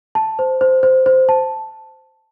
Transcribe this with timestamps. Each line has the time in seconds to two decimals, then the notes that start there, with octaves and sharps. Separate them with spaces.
0.15 A5
0.39 C5
0.61 C5
0.83 C5
1.06 C5
1.29 A5